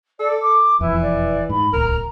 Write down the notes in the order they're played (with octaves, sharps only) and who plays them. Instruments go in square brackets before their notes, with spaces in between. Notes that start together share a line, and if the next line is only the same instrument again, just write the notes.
[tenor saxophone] A4 [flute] D5
[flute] D6
[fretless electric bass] E1 F2 [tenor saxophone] E3 [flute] E4
[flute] D5
[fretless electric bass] G#2 [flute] B5
[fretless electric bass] D1 C2 [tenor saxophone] A#4 [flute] A#5